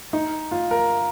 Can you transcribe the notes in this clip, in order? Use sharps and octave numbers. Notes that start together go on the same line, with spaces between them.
D#4
F4
A#4